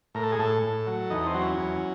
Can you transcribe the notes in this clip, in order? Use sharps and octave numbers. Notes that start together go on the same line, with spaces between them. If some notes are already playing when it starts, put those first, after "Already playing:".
A2 A#4
A4
G#4
A2 A4
A2
F#3
E2 D#4
C4
F#3
C#4
E2